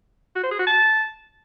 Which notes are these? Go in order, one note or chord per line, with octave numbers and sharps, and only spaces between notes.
F#4
C5
G#4
F#4
A5